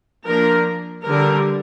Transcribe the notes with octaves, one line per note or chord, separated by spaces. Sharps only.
F3 A#3 D4 A#4
D3 G3 D4 A#4